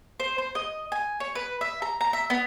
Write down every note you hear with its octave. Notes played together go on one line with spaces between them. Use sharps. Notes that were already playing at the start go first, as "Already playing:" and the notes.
C5
C5
D#5
G#5
C#5
B4
E5
A#5
A#5
E5
B3